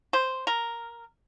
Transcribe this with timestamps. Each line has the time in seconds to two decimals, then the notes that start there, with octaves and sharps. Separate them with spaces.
0.13 C5
0.47 A#4